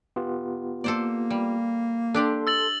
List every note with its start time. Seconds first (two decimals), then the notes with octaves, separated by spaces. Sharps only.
0.16 B3 F4 G4
0.84 A#3 A4 C5 D5
1.30 G3
2.14 D4 G4 A4 D5 C6
2.47 E6 A6 F#7